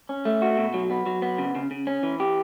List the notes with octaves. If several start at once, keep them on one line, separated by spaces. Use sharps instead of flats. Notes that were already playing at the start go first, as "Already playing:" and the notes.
C#4
A3
F#4
B2
F#3
B3
F#3
B3
C#3
C#3
C#3
C#4
E3
G4